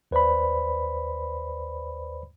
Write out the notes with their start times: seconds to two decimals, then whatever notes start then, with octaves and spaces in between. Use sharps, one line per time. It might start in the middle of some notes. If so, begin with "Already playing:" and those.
0.11 D#2 B4 C5 D5 B5